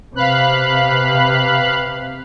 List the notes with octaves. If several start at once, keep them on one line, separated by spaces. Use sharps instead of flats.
C3 C4 B4 F5 B5 F#6